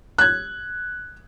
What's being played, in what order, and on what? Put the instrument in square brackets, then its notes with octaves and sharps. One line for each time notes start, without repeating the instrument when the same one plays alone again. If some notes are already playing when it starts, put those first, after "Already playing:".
[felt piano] F#6 G#6